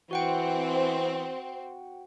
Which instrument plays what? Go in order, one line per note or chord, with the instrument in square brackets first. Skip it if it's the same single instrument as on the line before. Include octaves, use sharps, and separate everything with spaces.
[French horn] E3 [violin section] C4 [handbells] F#4 F#5 G5